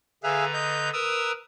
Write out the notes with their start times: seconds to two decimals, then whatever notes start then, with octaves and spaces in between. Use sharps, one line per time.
0.24 D3 G#4 B4 E5 F5 A#5
0.54 D#5 G6
0.93 A#4 B4 A#5 D#6 E6